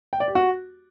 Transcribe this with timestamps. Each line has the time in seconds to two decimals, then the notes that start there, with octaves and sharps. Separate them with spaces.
0.13 G5
0.20 D5
0.28 G4
0.35 F#4